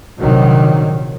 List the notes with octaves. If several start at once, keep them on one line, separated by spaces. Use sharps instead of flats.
A#1 C3 D#3 F#3